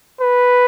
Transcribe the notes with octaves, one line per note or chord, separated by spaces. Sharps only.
B4